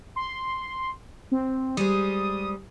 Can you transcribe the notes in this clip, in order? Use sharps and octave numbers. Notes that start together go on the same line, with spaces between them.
C6
C4
G3 G#3 C5 D#6